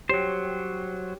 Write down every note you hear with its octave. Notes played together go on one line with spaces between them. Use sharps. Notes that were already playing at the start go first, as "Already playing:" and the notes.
F#3 G4 C5 C#5